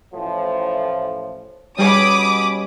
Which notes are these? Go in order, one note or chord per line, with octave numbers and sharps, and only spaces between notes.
A1 A2 F3
B2 G3 C#4 G#4 C#5 B5 D6 D#6